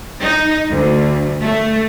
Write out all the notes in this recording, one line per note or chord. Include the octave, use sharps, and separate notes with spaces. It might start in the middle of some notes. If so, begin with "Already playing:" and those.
D#4
D2
A3